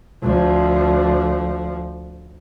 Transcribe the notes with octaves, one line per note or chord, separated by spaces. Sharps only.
D2 F3